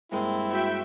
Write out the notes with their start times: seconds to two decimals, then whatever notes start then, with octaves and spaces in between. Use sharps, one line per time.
0.12 G2 G#3 A#3 C4 E4
0.50 F#4 E5 G5